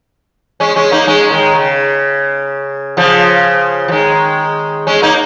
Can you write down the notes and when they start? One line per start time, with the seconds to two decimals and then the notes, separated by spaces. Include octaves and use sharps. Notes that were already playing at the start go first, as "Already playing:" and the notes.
0.60 G#3 C#4
0.76 G#3 C#4
0.92 A#3 D#4
1.07 G#3 C#4
1.31 D#3 G#3
1.55 C#3
2.97 C#3 F3
3.88 F3
3.92 D#3 G#3
4.87 G#3 C#4
5.02 A#3 D#4